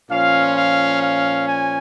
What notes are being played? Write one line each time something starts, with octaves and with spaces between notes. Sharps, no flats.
A#2 F3 C#4 F5
F5
F5
G#5